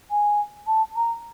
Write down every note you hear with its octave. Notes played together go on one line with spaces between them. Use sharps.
G#5
A5
A#5